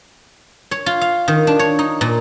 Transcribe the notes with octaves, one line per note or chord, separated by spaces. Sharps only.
C#5
F4
F5
D#3
D4
C#5
D#4
A#2